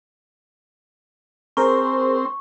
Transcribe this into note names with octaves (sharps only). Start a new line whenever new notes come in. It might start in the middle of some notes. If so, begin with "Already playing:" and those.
C4 G#4 A#4 C5 C#6